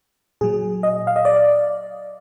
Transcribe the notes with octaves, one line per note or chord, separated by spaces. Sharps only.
A#2 F#3 G#4
D#5
F5
D#5
D5